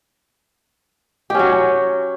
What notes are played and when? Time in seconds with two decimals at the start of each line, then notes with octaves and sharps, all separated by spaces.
1.30 G4
1.35 C#4
1.39 F#3